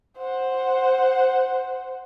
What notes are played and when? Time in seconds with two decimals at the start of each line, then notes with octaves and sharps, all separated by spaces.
0.18 C5 F#5